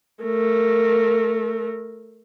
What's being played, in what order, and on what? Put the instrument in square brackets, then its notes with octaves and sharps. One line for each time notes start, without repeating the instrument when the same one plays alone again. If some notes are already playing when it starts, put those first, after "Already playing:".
[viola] A3 A#4